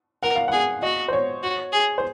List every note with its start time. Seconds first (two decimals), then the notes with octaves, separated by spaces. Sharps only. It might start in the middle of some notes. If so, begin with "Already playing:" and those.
0.23 A#4 F#5
0.35 F5
0.48 G#4 F#5
0.83 F#4 D#5
1.08 C5
1.13 C#5
1.43 F#4
1.72 G#4
1.98 C5